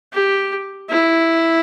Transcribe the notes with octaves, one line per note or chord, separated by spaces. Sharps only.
G4
E4